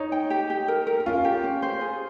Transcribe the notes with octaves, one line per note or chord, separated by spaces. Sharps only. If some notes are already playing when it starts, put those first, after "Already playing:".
Already playing: D#4 C#5
G5
G4
G4
A#4
A#4
C#4 F4
G4
C#4
C5
G#4